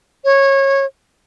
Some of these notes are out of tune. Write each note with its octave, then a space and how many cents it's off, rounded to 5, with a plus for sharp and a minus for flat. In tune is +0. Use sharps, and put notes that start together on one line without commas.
C#5 -20